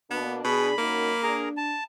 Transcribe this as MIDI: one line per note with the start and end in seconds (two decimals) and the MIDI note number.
0.11 0.44 47
0.11 0.44 58
0.11 0.35 59
0.11 0.44 62
0.44 0.69 47
0.44 0.75 62
0.44 0.75 68
0.44 1.21 83
0.78 1.12 42
0.78 1.56 58
0.78 1.12 63
1.23 1.76 62
1.23 1.49 68
1.23 1.49 70
1.23 1.49 82
1.57 1.84 81